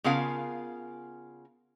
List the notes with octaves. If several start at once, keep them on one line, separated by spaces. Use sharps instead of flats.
C#3 B3 F4 A#4 F5 G#5